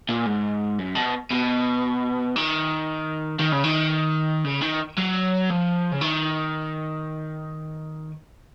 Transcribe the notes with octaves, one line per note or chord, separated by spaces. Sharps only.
A#2
G#2
F#2
B2
B2
D#3
D#3
C#3
D#3
C#3
D#3
F#3
F3
C#3
D#3